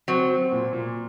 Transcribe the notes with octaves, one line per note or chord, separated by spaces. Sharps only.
F#3 C4
C4
A#2
A#2